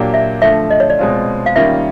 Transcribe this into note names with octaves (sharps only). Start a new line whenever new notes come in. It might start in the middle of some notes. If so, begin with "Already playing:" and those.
Already playing: A#2 F#3 A#3 D4 G4
E5
D3 F3 A3 E5
D#5
C#5
D5
B2 G#3 C4 F4
F5
D#3 G3 A#3 C#4 F4 E5